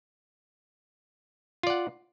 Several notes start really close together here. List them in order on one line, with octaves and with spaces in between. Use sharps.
F4 D5 F#5